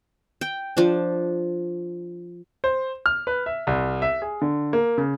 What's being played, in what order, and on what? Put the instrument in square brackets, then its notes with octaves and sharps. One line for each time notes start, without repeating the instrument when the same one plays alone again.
[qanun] G5
F3 D4
[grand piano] C5
F6
B4
E5
C2
E5
G#4
D3
A#3
C#3